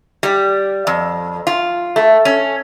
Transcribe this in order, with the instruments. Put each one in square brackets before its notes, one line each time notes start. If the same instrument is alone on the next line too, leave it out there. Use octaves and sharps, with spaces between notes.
[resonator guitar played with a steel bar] G3
F2
F4
A3
C#4